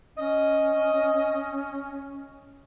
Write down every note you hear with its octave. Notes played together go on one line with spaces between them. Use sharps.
C#4 D#5